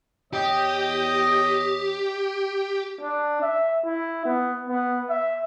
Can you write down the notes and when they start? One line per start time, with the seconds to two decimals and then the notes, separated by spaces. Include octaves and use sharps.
0.33 E2 G4 C#5 D#5
3.01 D4
3.42 E5
3.85 E4
4.25 B3
4.68 B3
5.09 E5